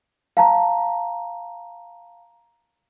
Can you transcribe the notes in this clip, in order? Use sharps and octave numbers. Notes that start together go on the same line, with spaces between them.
F5 A5 A#5